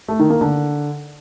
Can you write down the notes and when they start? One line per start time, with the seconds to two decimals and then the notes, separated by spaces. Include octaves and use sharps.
0.08 A3
0.19 D#3
0.30 A#3
0.41 D3